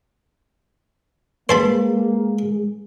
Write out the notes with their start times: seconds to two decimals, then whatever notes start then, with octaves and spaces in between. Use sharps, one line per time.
1.49 G#3 A#3 B4 C5 A5 B5